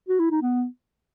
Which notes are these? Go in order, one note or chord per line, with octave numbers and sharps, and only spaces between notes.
F#4
E4
D#4
B3